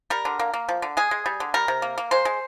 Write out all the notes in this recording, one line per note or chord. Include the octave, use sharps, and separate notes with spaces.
G3 A#4
D3
A#3
A#3
F3
D3
G#3 G#4
G#3
G3
D3
G3 A#4
C3
A#3
A#3
G#3 C5
G#3